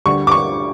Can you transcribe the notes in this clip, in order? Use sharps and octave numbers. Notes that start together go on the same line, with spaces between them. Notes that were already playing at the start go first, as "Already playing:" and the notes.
D2 D3 G3 C#6
D6
C#6